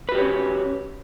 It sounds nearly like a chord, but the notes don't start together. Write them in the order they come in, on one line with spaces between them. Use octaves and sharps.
B4 F#4 G4 C#5 C#4